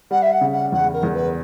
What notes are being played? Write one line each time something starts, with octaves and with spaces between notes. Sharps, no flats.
G3 F#5
E5
F#5
C#3
F#5
E2 F#5
A#4
E2
B4